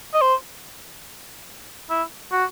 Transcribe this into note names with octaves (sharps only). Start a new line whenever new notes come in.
D#5
C5
E4
F#4